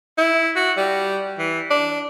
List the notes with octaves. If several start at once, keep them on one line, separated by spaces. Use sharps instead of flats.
E4
F#4
G3
E3
D4